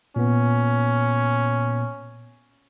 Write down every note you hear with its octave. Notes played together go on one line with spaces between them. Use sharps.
A#2 B3 C#4